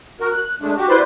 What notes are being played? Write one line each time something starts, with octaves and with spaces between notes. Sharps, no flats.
F#4 A#4
F#6
G#3 A3 D4
F#4 G4
E4 B4 C5 D5 B5 C6